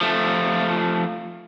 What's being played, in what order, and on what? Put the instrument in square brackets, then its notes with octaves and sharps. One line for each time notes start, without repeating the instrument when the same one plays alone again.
[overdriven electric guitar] F3 A3